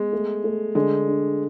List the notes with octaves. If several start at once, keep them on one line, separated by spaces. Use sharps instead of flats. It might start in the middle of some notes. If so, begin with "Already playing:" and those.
Already playing: G#3 B3
A3
A3
D3 G#3
D4